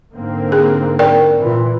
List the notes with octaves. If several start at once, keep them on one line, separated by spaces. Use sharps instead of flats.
G#2 D3 A#3 C4
G#4
A#4 D5 G5
A#2 E3